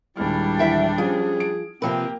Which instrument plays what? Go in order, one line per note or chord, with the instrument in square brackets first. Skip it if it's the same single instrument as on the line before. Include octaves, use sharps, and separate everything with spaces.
[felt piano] D#1 G#3 F6 [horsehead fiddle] G3 D4 [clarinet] E4
[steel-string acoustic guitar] E3 E5 G5
[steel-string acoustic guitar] F3 [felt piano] C#4 G4 C5 [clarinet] G#4
[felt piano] D7
[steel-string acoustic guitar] C3 F3 B4 [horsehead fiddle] A#3 G4 [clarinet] C4